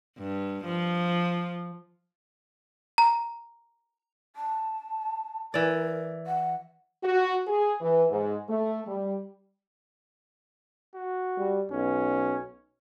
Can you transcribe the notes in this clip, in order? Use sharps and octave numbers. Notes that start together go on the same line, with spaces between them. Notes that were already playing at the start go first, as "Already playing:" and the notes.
G2
F3
A#5
A5
E3 A#4 D5
F#5
F#4
G#4
E3
G#2
A3
G3
F#4
G3
B1 C#4